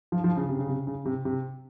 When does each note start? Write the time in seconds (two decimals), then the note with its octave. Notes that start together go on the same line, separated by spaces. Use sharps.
0.12 F3
0.24 F3
0.37 C#3
0.49 C3
0.59 C#3
0.69 C3
0.87 C#3
1.05 C3
1.25 C3